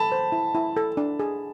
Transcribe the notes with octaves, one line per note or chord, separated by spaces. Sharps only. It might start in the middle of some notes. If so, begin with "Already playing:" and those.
Already playing: A4 A5 B5
C5
E4
E4
A4
D4
G#4